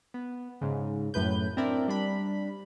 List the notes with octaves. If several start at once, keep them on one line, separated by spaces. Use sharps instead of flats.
B3
G#2 C#3
F#2 A2 B4 G6
C4 D4 E4 A#4 D5 E5
G3 D4 B5